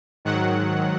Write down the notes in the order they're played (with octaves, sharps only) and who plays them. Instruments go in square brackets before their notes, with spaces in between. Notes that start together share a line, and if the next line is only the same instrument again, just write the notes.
[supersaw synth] G#2 D#3 F#3 F#5